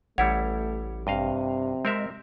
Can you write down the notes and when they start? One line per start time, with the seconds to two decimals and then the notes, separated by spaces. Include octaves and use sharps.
0.18 A1 G3 A3 E4 C#5 F#5
1.07 G2 C3 D#5 F5
1.85 G#3 C4 A#4 E5